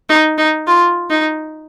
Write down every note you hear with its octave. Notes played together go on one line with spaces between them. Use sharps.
D#4
D#4
F4
D#4